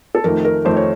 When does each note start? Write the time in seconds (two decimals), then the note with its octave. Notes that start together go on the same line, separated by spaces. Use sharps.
0.15 A4
0.24 F2 D#3 A3 A#4
0.45 A#4
0.65 F2 D#3 A3 C5
0.77 C#5